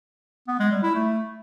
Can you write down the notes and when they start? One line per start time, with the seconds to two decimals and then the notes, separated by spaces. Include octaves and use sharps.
0.48 B3
0.60 G#3
0.71 G3
0.83 E4
0.95 A3